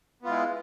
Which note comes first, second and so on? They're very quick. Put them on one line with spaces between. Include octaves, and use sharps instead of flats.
B3 F4 G#3 E4